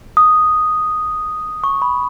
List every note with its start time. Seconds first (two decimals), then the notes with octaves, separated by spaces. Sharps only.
0.17 D#6
1.64 C#6
1.82 B5